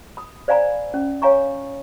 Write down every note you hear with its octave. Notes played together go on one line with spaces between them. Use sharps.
B5 D#6
C5 D5 F5 G#5 A#5 B5
C#4
C#5 F5 G#5 A#5 C#6